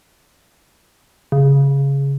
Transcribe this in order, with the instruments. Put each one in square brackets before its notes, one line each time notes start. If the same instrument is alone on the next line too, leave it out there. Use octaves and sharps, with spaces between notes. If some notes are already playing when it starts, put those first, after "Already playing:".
[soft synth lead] C#3